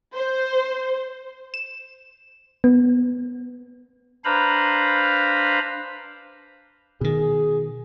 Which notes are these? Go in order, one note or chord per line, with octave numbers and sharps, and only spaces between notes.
C5
E7
B3
D4 B4 C5 F5 A#5 B5
B2 D#3 G#4